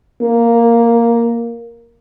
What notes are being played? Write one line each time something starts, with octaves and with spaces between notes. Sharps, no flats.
A#3